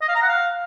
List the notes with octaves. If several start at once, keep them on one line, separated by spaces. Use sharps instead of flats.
D#5
F5
A#5
F#5
F5